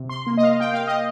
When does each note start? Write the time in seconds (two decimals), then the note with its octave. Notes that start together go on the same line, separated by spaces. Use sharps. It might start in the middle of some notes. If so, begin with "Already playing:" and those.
Already playing: C3
0.09 C6
0.27 A#3
0.37 D#5
0.43 F5
0.60 A#3 G5
0.74 F5
0.87 D#5